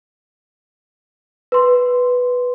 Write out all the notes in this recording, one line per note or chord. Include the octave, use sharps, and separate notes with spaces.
B4 C6